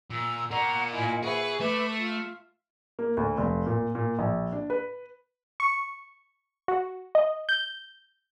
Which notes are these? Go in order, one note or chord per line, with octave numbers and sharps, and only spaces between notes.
A#2 E6
A#4 D5 F#5 A#5 C#6
A#2 E4 D#5 G#5
G#4 B4 E5 F#5 C#6
A3 B4 E5 B5 D6
F4
A#3
D2
F1
A#2
A#2
A#1
D4
B4
C#6
F#4
D#5
G6